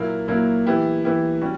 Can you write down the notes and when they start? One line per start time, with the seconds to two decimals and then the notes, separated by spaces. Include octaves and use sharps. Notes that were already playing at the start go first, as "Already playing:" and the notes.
Already playing: A#2 F#3 A#3 E4
0.28 A#2 F#3 A#3 E4
0.66 E3 B3 E4 G4
1.04 E3 B3 E4 G4
1.41 G3 C#4 F#4